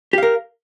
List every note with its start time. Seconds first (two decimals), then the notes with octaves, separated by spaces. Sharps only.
0.13 G4
0.18 F5
0.23 A#4